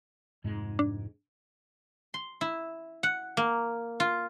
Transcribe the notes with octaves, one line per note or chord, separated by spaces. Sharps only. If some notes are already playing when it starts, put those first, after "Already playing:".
F1 G#2 G#3
D4
C6
E4
F#5
A#3
F4